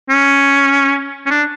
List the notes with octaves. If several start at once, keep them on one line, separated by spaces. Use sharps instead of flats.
C#4
C#4
D4